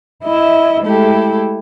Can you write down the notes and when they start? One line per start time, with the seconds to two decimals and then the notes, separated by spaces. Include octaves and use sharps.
0.23 E4 D#5 E5
0.82 G#3 A3 E4 G4 A4